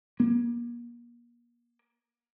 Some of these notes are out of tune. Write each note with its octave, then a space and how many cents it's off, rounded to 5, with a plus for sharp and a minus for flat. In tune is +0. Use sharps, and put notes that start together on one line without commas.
A#3 +35